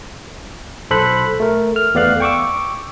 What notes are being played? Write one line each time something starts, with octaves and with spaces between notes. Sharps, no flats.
B1 A4 C5 B5 F#6
A3 A#4
F6
E2 A3 B3 D5 F5 F#6
G5 C#6 D6 E6